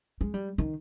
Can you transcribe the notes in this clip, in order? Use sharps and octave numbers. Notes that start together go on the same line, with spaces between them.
G#3
G3
D#3